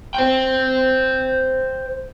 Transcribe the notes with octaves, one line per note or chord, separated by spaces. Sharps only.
C5 G5